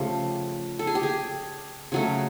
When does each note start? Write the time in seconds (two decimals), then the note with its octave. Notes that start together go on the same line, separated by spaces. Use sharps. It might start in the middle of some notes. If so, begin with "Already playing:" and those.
Already playing: C#3 F3 A3 G4
0.79 A4
0.87 G#4
0.95 G4
1.03 G#4
1.92 C#3 F#3 A3